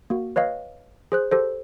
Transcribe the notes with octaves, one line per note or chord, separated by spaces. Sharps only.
A#3 F#4
B4 C#5 D#5 F5
G#4 C5 F#6
G4 A4 C5